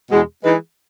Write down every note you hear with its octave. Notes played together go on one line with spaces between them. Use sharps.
E2 B2 G#3
E3 G#3 D#4 G#4 B4